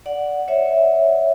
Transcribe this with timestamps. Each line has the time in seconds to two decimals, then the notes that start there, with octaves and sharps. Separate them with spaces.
0.06 D5 F#5
0.48 C#5 E5